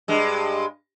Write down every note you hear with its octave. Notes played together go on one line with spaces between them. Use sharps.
G2 G#3